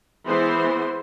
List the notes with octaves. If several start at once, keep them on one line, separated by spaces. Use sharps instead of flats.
E3 G#3 B3 C5 C6